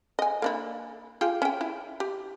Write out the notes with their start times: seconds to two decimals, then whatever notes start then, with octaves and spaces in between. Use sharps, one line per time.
0.19 D#5 G#5
0.42 A#3 D4 E4
1.21 F4 G4 G#4
1.42 C#4 G5
1.61 E4
2.00 G4